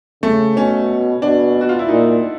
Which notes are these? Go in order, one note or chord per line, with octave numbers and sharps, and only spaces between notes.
C#3 A3
B2 C#4
B2 D4
F#4
F4
E4
A#2 D#4